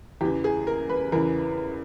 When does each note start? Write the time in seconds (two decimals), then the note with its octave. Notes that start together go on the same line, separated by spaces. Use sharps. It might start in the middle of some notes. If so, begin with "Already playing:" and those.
0.21 E2 C#3 E3 G4
0.44 G#4
0.67 A#4
0.89 B4
1.12 E2 C#3 E3 A#4